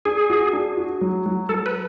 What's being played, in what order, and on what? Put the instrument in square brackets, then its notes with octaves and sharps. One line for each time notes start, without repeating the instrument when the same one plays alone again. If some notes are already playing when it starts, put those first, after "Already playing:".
[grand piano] D4 [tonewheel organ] G#4
[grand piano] F#4
D4
F#4
F#3
F#3
[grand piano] F#3 [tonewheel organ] A4
[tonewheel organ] B4